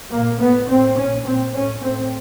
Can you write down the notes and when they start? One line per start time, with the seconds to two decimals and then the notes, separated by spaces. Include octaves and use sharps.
0.12 A#2 A#3
0.41 A2 B3
0.69 A2 C4
0.97 A#2 C#4
1.26 A#2 C4
1.54 A2 C#4
1.83 A2 C4